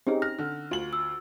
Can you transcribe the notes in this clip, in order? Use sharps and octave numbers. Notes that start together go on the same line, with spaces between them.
C4 C#4 D#4 G4 G#4
F6 A#6
D3
D2 F4 F#7
E6